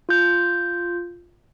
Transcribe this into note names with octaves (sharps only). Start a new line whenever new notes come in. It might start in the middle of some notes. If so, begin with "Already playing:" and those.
F4 G6